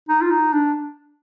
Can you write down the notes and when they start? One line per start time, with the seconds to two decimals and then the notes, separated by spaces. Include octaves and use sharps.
0.09 D#4
0.22 F4
0.30 D#4
0.53 D4